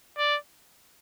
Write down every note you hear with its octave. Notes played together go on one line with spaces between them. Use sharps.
D5